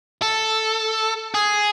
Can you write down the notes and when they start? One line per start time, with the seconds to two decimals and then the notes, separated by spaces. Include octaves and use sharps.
0.22 A4
1.34 G#4